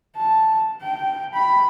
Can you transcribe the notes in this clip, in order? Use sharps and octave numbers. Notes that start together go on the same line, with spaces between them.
A5
G5
B5